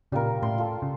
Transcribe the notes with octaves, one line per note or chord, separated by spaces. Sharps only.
A#2 C#3 G3 F4 A#4
A2 C6
F4 A4
C#3